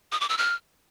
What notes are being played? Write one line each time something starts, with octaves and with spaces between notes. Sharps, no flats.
D#6
D6
E6
F6